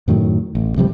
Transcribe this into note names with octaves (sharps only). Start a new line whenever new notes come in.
F#2 A2 D#3 F#3
A1
D1 C3 F3 G3